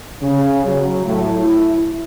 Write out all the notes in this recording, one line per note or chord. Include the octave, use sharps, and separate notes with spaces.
C#3
F#3
A2
E4